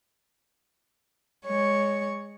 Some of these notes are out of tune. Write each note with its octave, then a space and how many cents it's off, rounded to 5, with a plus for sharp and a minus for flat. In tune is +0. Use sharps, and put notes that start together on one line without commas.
G#3 -15 C#5 +0 C#6 +0